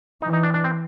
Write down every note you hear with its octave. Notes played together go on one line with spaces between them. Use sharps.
E3 D#4
D#4
D4
D4
C4